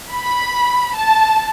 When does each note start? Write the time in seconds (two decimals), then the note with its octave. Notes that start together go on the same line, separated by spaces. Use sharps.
0.11 B5
0.95 A5